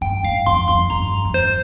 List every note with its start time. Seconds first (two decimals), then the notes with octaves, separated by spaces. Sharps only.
0.01 G2 G5
0.23 G#2 F5
0.46 F2 C6
0.68 F2 C6
0.90 G2 A#5
1.25 F2
1.34 G2 C5